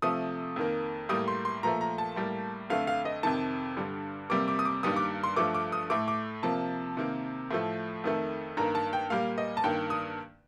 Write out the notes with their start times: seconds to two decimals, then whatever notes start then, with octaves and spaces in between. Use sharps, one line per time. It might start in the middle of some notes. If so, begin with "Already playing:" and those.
0.02 C3 F3 A3 D#6
0.56 F2 D#3 A#3
1.09 A2 G3 A#3 D#6
1.28 C6
1.45 C6
1.63 A#2 F3 A3 A#5
1.81 A#5
1.98 A5
2.16 A2 G3 A#3
2.70 F2 D3 A3 F5
2.87 F5
3.05 D#5
3.23 F2 C3 D#3 A5
3.77 G2 D3 G3
4.30 F2 C3 G3 A#3 D6
4.48 D6
4.59 D#6
4.65 D6
4.83 G2 D#3 G3 A#3 D#6
4.96 D6
5.24 C6
5.36 G2 F3 A3 D6
5.54 D6
5.72 D#6
5.90 A2 A3 D6
6.08 D6
6.43 C3 F3 A#3 A5
6.97 C3 D#3 A#3
7.51 A2 F3 A3
8.04 F2 D#3 A3
8.57 G2 D#3 A#3 A#5
8.75 A5
8.93 G5
9.10 A#2 G3 A#3 F5
9.38 D#5
9.57 A5
9.64 G2 D#3 A#3 G5
9.90 D#6